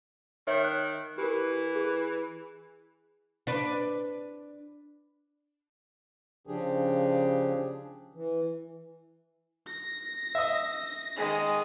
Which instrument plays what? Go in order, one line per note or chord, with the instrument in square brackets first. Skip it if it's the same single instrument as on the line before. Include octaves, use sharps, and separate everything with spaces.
[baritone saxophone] D#3 [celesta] C#5 E5
[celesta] F#6
[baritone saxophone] E3 [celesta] G4 A#4
[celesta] G#4
[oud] D4 B4
[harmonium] C#3 F3 D4 G4 G#4
E3
[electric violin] A#6
[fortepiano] D#5 E5
[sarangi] D#3 [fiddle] G#3 G#4